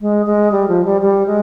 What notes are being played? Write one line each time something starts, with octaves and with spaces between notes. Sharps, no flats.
G#3
G#3
G3
F3
G3
G3
G#3